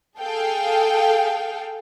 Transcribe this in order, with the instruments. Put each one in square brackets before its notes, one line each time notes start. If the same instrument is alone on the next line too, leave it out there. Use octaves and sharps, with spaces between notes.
[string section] G#4 A4 F5 G5